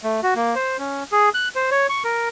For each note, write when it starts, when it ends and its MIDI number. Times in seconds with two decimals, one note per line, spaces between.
0.03 0.21 57
0.23 0.34 66
0.35 0.55 58
0.55 0.77 72
0.79 1.04 61
1.12 1.29 68
1.34 1.49 90
1.56 1.70 72
1.71 1.87 73
1.89 2.03 85
2.04 2.29 70